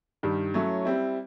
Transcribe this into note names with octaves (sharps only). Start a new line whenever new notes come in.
G2 D#3 G3
F#3 A3 C#4 E4
G3 C4 E4